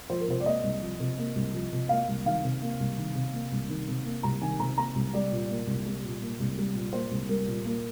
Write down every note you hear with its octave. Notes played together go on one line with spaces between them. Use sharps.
F3 C5
A#4
C3 C5
D5
A#3 D#5
C2
F3
C3
A#3
C2
F3
C3
A#3 F5
C2
D#3 F5
C3
A#3
C2
D#3
C3
A#3
C2
D#3
C3
A#3
C2 A#5
D#3 G#5
C3 A#5
A#3 A#5
C2
G3 D5
A#2
A#3
C2
G3
A#2
A#3
C2
G3
A#2
A#3 C5
C2
G3 A#4
A#2
A#3